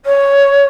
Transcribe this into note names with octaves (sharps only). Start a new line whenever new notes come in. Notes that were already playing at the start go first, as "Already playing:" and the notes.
C#5